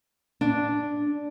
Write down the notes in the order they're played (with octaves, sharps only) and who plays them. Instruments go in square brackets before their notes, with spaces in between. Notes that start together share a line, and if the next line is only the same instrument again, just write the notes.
[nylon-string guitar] D4